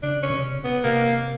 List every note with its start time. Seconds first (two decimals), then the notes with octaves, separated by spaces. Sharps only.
0.03 C#3 D4
0.23 C#4
0.30 C3
0.64 B3
0.84 C3 A#3